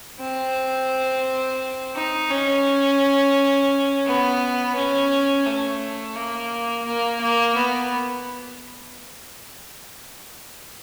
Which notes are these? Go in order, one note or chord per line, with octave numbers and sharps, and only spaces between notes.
C4
D#4
C#4
B3
C#4
A3
A#3
A#3
A#3
B3